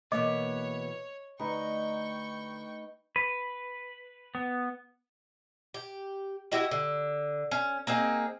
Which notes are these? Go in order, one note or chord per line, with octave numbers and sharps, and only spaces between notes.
B2 E3 A#3 C#5 D#5 D6
D2 D#4 B4 G5 A#5 C#6
B4
B3
G4
E4 F#4 G4 D#5
D3
C#4
A#3 C4 D#4 G#4